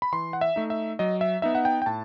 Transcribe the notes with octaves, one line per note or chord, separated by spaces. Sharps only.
B5
E3 C6
F#5
E5
A3 D#4
E5
F#3 D#5
E5
B3 D#4 E5
F#5
G5
G5
A2 A5